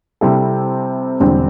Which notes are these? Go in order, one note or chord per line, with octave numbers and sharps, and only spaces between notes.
C3 G3 C4 E4 A4
E1 E2 D3 G3 C4